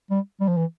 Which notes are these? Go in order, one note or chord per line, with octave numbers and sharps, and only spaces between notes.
G3
G3
F3
E3